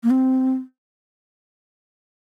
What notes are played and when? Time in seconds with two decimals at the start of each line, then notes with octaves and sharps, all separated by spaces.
0.03 A#3
0.10 C4